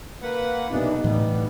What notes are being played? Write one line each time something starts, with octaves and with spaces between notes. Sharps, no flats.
A#3 B4 F#5
B1 C3 E3 B3 D4 D#4
A2 E3 G3 B3